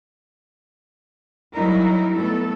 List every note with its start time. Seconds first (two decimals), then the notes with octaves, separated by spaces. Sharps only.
1.53 F#3 G3 D#4 E4 A#4
2.15 A3 B3 A4